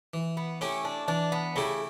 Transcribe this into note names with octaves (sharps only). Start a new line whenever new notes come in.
E3
B3
A3 C#4 E4 G4
D4
E3 D4
B3
C#3 A3 E4 G4